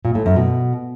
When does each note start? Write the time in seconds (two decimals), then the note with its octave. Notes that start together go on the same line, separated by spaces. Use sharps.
0.05 A#2
0.15 A2
0.26 F#2
0.36 B2